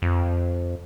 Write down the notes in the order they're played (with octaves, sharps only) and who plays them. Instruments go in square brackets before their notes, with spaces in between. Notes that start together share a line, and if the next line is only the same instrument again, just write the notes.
[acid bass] F2